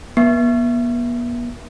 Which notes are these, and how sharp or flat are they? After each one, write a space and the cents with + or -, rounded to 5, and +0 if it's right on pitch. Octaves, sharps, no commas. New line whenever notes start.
B3 -45